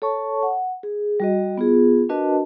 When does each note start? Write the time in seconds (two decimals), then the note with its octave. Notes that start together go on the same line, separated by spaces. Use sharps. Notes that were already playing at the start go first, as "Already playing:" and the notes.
0.02 A4 C#5 A5 C#6
0.43 F#5
0.83 G#4
1.20 G3 F#4 D#5
1.58 B3 F4 G#4
2.09 D4 F#4 A#4 B4 D#5 A5